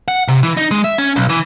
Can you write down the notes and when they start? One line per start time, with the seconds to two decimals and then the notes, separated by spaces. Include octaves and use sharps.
0.08 F#5
0.28 C3
0.43 E3
0.57 D#4
0.71 G#3
0.84 E5
0.98 C#4
1.16 B1
1.29 E3